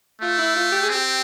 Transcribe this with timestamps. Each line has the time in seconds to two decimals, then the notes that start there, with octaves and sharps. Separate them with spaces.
0.21 A3 F4
0.38 E4
0.56 F4
0.72 G4
0.83 G#4
0.89 C4
0.94 G4